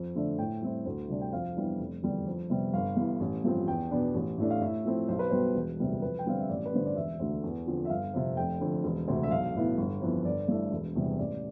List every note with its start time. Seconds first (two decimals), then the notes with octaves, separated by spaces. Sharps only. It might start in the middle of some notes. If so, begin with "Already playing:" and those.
Already playing: F2
0.15 D3 A3 D4
0.39 A2 G5
0.62 G3 C4 E4
0.86 D2
1.09 C3 G3 D4
1.21 G5
1.33 F2 F5
1.56 E3 G3 B3 D4
1.79 F1
2.03 E2 D3 G3 D4
2.27 F2
2.50 C3 G3 B3
2.73 G1 F5
2.97 G2 E3 B3
3.20 A1
3.44 G2 F3 C4
3.67 E2 G5
3.91 B2 B3 D4
4.14 A1
4.38 A2 E3 A3 D4
4.50 F5
4.61 A2 E5
4.85 F3 A3 C4 E4
5.08 B1 C5
5.19 B4
5.30 B2 G3 B3 C5
5.55 E1
5.79 D2 C3 G3 B3
6.02 F2 B4
6.19 G5
6.26 D3 G3 C4 F5
6.39 E5
6.49 A1 D5
6.66 B4
6.73 G2 D3 C5
6.86 D5
6.96 E1 E5
7.19 D2 D3 A3
7.43 E2
7.67 D3 F3 C4
7.85 E5
7.90 G1 F5
8.14 F2 C3
8.37 F1 G5
8.60 F2 D3
8.84 E1
9.08 D2 C3
9.23 E5
9.31 B1 F5
9.55 A2 E3 B3 E4
9.78 G1
10.01 F2 E3 B3
10.25 G1 D5
10.48 G2 E3 A3
10.72 E1
10.96 E2 C3 G3
11.19 A1 D5